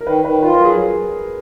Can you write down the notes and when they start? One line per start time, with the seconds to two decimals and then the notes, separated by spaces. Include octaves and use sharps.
0.01 A#4
0.07 D#3 B4
0.24 D#3 B4
0.42 F4 B4
0.54 A#4
0.60 F#3 G#4